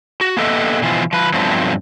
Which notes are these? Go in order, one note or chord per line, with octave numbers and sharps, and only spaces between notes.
F#4
A#3 B3 G4 A4 D#5 E5
B2 E3 F3 F4
F3 B4
G2 F3 F#3 A3 B3 C4